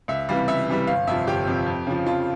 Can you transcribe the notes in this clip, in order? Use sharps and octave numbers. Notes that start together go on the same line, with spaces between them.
C#2 E5
C3 E3 G3 F5
C#2 E5
C3 E3 G3
G1 F5
F2 C3 F3 E5
G1 G4
F2 C3 F3
F2
C#3 F3
F2 F4